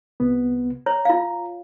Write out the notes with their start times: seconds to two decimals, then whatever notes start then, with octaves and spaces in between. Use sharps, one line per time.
0.20 C2 C3 B3
0.86 C#5 A#5
1.05 F4 F5